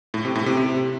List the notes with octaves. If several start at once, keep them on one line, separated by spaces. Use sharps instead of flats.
A2
C3
A2
C3
C3